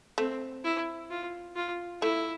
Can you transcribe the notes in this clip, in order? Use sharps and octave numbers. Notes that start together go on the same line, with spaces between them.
A3 C4
E4
F4
F4
A3 E4